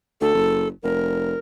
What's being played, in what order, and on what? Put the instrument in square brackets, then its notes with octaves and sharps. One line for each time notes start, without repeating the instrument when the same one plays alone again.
[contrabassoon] D2 [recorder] A4
[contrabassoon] F#1
[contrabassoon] F1 [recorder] A#4